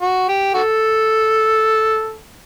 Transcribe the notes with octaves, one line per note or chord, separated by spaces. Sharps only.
F#4
G4
F#4 A4